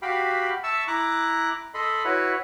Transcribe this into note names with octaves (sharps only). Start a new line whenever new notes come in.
F#4 G4 F5 G5 B5
E5 A5 C#6 E6
E4 A#5 D6 F#6
A4 D#5 B5 C6
E4 F#4 B4 C#5